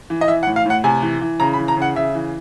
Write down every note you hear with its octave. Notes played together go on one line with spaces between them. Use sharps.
E3
D#5
E3 E5
F#5
A2
F5
A2 F#5
C3 G#5
E3
E3
C#3 A#5
B5
E3
A#5
C#3 F#5
C#3 E5
E3